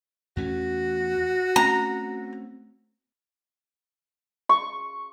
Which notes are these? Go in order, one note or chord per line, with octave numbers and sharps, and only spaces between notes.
E2 A3 C#4 F#4
A3 C4 C#4 A#5
C#6